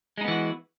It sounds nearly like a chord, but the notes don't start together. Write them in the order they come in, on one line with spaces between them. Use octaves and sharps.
G#3 D#4 B3 E3 F#4